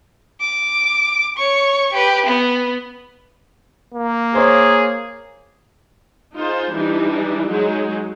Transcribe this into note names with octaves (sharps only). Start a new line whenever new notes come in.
D6
C#5 C#6
G4 B4
B3
A#3
G#4 C5 C#5
D#4 F4 G#4 C5
E3 G3 D4 D#4
F#3 G#3 D#4 G#4